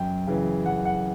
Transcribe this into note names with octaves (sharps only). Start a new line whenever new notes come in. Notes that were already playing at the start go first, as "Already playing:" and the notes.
Already playing: F#2 G5
C#3 E3
F#2 F#5
F#5